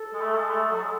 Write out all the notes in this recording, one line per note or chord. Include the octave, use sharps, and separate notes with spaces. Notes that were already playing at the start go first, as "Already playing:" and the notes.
Already playing: A4
G#3
A3
G#3
A3
F#3
G#3